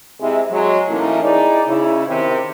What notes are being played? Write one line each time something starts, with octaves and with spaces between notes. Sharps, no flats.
C3 G#3 E4
F#3 G#3
A2 E3 A3 A#3 C#4 D#4
D#4 E4 G#4 D5
C#3 E4
C3 D#3